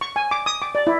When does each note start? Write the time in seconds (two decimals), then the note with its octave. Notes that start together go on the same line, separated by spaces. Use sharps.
0.01 C#6
0.16 G#5
0.31 D6
0.46 D#6
0.62 D6
0.75 D5
0.87 E4